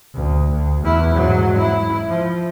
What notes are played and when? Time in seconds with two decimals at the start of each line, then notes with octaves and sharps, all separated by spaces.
0.15 D2
0.49 D2
0.81 E2 E4
1.15 G#2 F#3
1.57 E4
2.08 F3